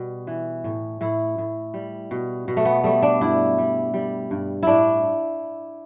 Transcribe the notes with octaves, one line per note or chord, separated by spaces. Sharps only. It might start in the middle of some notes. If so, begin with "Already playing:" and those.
Already playing: B2 G3
E3
A2
A2 E4
A2
G3
B2
B2
A3
B3
G3 A3
D4
G2 E4
G3
G3
G2
A2 D4 E4